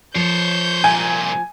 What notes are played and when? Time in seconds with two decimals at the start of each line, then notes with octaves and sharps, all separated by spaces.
0.15 F3 C5 C#5 G6
0.84 C2 A#2 G#5